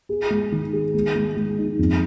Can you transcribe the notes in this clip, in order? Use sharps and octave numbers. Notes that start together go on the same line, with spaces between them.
G#4
G#3
D#3
G#4
G#3
G#3
G#3
D#4
F2